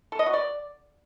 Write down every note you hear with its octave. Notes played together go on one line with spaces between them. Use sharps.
A4
D#5
F#4
D5